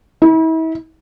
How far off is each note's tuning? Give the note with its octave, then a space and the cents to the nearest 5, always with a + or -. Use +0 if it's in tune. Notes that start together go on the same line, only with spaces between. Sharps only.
E4 -40